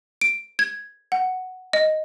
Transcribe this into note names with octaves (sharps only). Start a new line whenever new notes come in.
D7
G#6
F#5
D#5